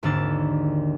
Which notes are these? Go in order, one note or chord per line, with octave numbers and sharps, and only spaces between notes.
G#1 D#2 D3 A#3 E6 A6